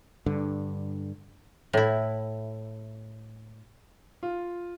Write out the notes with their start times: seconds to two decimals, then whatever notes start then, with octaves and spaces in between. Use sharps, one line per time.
0.26 G2 D3
1.73 A2 E4
4.23 F4